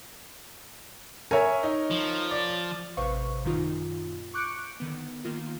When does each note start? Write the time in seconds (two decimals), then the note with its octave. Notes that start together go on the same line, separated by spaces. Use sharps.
1.31 A#4 C#5 E5 G#5
1.63 D#4
1.90 F3
2.31 D5
2.97 A1 C3 B4 C5 F5 C#6
3.45 F#2 A#2 D#3 D#4 F4
4.34 C#6 D6 F#6 G6 C#7 D7
4.80 D3 D#3 B3
5.24 D#3 A#3 F4